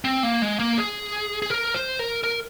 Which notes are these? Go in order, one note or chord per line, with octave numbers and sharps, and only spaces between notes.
C4
A#3
G#3
A#3
G#4
G#4
A#4
C5
A#4
A#4